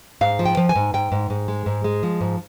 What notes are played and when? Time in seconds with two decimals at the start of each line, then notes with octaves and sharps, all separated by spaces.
0.21 G#2 F5
0.39 F3
0.46 G5
0.57 F3
0.69 G#5
0.76 G#2
0.94 G#2 G5
1.12 G#2
1.30 G#2
1.48 G#3
1.66 G#2
1.84 G#3
2.03 F3
2.21 G#2